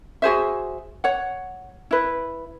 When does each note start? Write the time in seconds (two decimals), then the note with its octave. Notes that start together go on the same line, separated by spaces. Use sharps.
0.22 F#4 G#4 C5 E5
1.04 C#5 F#5
1.91 E4 B4